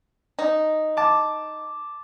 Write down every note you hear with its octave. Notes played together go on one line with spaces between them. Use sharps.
D#4
A5 D6